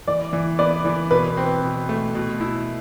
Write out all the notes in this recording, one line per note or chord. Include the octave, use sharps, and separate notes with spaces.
E3 D5
E3
B3 D5
E3
B2 B4
C4
B2
A3
B2
E4